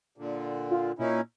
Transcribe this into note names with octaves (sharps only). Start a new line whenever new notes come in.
A#2 D3
F4
A#2 C#4 D#4 E4